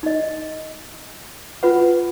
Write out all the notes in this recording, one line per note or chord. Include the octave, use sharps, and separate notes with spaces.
D#4 D#5
F4 B4 F#5